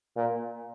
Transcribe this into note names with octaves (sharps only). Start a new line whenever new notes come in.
A#2